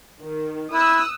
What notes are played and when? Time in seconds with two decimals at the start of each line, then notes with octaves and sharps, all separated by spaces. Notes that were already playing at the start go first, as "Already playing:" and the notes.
0.22 D#3
0.73 E4 D#6 E6 F#6